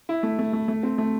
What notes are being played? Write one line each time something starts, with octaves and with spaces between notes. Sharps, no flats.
E4
A3
A3
A3
A3
C4
A3